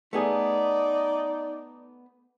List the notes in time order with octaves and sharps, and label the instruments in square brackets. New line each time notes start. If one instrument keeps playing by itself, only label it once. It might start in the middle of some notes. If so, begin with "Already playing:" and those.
[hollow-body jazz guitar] A3 B3 G#4 [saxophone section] D#4 D5